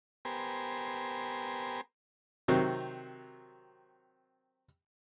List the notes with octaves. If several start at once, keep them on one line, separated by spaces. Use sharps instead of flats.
B3 G4 A#4 C5 G#5
C3 D#3 F#3 C4